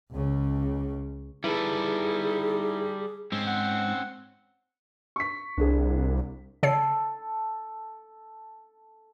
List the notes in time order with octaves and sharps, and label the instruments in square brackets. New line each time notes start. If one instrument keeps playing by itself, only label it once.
[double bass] C#2 C#3
[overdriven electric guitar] G3 A4 [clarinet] D#4 [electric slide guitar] E4 B4 [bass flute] G#4
[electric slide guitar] G#2 [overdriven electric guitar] C4 C#4
[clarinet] F#5
[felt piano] C#6 B6
[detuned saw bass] C2 [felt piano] D4 G#4
[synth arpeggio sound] C#3 C#5 C7 [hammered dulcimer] A4